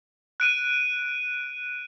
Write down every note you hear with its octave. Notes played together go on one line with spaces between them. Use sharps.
F#6 D7 D#7